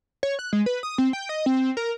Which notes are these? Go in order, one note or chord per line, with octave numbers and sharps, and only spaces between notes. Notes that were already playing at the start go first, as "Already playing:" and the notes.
C#5
F#6
G#3
B4
D#6
C4
G5
D#5
C4
A#4